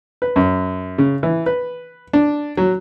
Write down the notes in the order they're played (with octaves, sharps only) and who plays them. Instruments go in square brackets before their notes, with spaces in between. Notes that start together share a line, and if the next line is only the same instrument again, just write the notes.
[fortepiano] B4
F#2
C#3
E3
B4
D4
F#3